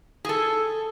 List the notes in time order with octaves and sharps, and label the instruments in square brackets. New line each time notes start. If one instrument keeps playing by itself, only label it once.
[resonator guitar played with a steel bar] G#4 A4